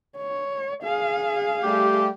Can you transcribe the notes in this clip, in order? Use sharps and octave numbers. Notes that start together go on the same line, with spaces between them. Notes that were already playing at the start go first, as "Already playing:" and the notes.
C#5
G#4 F5
G3 A3 G4